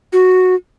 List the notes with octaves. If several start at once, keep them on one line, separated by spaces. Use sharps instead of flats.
F#4